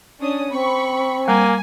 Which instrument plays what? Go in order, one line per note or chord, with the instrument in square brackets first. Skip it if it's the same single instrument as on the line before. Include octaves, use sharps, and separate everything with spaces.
[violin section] C#4 D4 D#6
[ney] C4 [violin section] B5 C#6
[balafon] G3 A#5 [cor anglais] A#3 [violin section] G#5